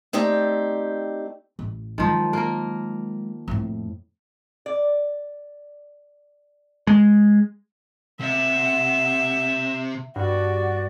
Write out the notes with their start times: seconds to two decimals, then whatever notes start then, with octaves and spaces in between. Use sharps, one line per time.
0.13 A3 C4 D#4 G4 D5
1.59 A1
1.98 D#3 F3 F#3 G#3
2.33 A#3 A#4
3.48 F2 A2
4.66 D5
6.87 G#3
8.20 C3 E5 F#5
10.16 G2 F#4 D5 F#5